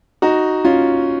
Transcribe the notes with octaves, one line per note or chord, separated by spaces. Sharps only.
D#4 F#4
C#4 F4